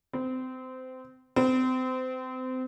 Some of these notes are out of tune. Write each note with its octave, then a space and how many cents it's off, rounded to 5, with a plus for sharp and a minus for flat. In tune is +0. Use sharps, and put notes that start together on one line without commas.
C4 -25
C4 -30